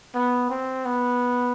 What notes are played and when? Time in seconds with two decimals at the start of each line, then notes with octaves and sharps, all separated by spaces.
0.15 B3
0.50 C4
0.86 B3